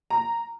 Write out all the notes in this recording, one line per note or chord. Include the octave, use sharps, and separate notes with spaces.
A#5